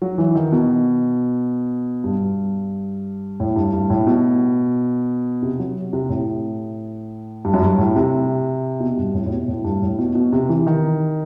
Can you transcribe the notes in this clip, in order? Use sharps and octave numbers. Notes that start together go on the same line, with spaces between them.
F#3
E3
D#3
B2
G2
A2
G2
G2
A2
B2
C3
F#3
C3
A2
G2
F#2
G2
A2
C3
B2
G2
A2
A2
B2
A2
G2
A2
B2
B2
C3
E3
D#3